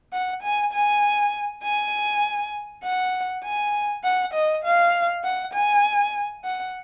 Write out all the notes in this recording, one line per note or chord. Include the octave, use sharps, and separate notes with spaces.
F#5
G#5
G#5
G#5
F#5
G#5
F#5
D#5
F5
F#5
G#5
F#5